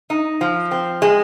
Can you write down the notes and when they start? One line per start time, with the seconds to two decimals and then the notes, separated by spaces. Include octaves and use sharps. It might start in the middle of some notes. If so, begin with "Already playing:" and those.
0.10 D#4
0.41 F3
0.71 C4
1.02 G#3